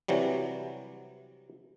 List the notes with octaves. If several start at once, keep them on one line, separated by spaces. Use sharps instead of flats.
C3 E3 F#3 G3